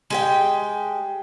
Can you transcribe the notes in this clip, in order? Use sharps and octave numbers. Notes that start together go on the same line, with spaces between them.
G#3 G4 G5